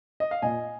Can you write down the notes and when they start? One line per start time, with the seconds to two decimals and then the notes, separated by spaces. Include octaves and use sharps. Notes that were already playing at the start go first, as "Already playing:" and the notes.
0.20 D#5
0.31 F5
0.42 A#2 D#5 G#5